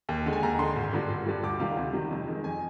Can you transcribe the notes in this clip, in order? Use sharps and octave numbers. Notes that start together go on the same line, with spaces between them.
D#2
D3 G#3
G#5
D#2 A#5
D3 G#3 C6
G#1
G2 D3 G3
G#1
G2 D3 G3
D2 D6
C3 D#3 G3 F5
D2
C3 D#3 G3
F2
D#3 G#3
F2 G#5